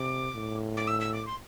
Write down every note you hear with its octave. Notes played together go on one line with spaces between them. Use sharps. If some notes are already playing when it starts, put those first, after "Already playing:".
Already playing: C3 D6
A2
D6
E6
E6
D6
C6